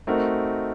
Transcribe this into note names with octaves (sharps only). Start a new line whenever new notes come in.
A3 C4 D#4 F#4 A#4